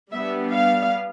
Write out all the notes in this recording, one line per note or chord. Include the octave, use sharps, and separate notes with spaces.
G3 B3 D4 E5
F5